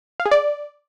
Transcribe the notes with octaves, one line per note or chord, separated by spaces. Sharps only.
F5
G#4
D5